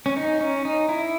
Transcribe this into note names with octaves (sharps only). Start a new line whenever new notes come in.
C#4
D#4
C#4
D#4
E4